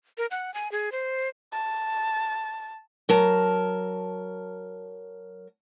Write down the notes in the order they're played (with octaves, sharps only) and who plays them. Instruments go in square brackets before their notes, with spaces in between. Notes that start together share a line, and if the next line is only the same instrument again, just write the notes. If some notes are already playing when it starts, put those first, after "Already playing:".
[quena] A#4
F#5
G#5
G#4
C5
[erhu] A5
[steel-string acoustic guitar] F#3 A#4 A5